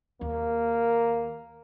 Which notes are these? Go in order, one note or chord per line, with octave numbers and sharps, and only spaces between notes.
D#2 A#3